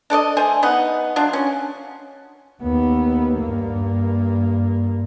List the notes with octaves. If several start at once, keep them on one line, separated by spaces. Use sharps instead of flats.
D4 A4 D5 D#5
A3 C5 G#5
B3 D#4 F#5
F#3 D4 F4
C#4
D#2 B3
G2 A#3